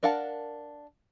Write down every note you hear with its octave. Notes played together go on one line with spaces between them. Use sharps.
D4 A#4 F5 F#5 A5